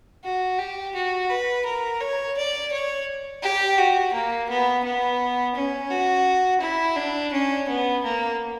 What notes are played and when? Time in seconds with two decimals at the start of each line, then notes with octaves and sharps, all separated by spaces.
0.24 F#4
0.59 G4
0.95 F#4
1.30 B4
1.65 A#4
2.01 C#5
2.37 D5
2.72 C#5
3.43 G4
3.78 F#4
4.14 A#3
4.49 B3
4.84 B3
5.55 C#4
5.91 F#4
6.61 E4
6.97 D4
7.32 C#4
7.68 B3
8.04 A#3